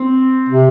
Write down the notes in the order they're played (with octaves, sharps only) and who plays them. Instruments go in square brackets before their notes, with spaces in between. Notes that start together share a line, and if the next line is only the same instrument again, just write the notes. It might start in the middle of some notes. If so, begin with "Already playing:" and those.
Already playing: [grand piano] C4
[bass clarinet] C3